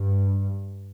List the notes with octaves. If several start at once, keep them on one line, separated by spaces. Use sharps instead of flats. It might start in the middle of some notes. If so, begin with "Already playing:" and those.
Already playing: G2